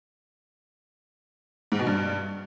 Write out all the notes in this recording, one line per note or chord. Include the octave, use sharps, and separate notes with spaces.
G#2
B2
G2